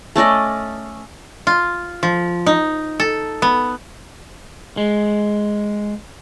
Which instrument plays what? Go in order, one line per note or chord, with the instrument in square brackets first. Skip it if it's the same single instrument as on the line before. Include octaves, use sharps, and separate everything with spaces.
[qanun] A3 C#4 D5 D#5
[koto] F4
F3
D#4
A4
B3
[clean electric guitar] G#3